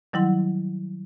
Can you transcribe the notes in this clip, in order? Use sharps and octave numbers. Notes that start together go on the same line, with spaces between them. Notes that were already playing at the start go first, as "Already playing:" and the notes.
D#3 F#3 G3 E4 F#5 C6